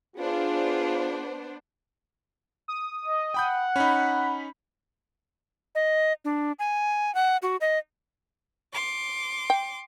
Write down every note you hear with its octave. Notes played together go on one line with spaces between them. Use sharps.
B3 D4 F4 G#4 C5
D#6
D#5
F#5 G5 B5 G6
C#4 D#4 B5
D#5
D4
G#5
F#5
F#4
D#5
C6 D6
G5